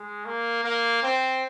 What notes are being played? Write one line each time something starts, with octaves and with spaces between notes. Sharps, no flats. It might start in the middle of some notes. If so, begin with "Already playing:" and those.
Already playing: G#3
A#3
A#3
C4